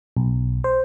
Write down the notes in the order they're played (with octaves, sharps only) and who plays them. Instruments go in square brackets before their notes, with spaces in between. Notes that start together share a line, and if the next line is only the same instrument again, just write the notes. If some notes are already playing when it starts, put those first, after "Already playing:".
[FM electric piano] B1
C5